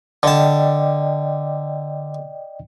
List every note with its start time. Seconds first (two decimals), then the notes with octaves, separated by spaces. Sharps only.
0.23 D3 D5 D#5 G5 A5